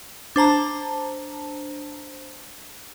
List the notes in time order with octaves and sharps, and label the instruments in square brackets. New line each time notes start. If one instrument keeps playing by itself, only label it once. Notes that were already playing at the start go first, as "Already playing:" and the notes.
[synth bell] D4 C5 A5 A#5